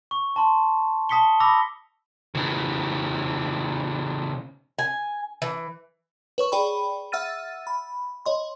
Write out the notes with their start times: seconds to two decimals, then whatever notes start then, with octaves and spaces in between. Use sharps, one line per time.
0.11 C#6
0.36 A5 C6
1.09 A5 D#6 B6 C#7 G7
1.40 B5 D6 E6 A#6
2.35 C#3 E3
4.79 G#5
5.42 E3
6.38 B4 C#5 C#6
6.52 G#4 D5 G5 B5
7.12 E5 F#5 E6 F6 A6 D#7
7.67 B5
8.26 C#5 D#5 C6